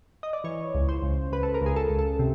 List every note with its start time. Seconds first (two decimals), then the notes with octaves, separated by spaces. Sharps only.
0.23 D#5
0.33 D5
0.44 E3 C#5
0.74 C#2
0.89 C5
1.03 C#2
1.32 C#2 B4
1.43 A4
1.54 A#4
1.62 C#2 G#4
1.76 A4
1.90 C#2
1.99 A4
2.19 C3